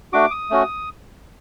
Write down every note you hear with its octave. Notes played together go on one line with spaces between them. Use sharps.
A3 D4 F#4 D6
D#6
A3 C#4 F#4